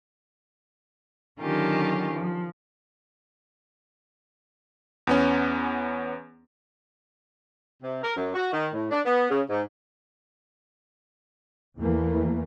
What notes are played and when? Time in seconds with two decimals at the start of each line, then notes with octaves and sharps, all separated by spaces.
1.40 D3 D#3 F#3 C#4 F4 G4
2.11 F3
5.07 E2 B3 C#4
7.82 C3
8.03 A#4
8.16 F#2
8.34 F#4
8.52 D#3
8.73 A2
8.91 D4
9.05 B3
9.29 C#3
9.50 G#2
11.78 E2 E3 A3 A#3